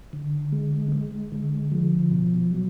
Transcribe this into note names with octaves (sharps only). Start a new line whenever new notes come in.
D3
G#3
G#3
D3
F3
B2
F#3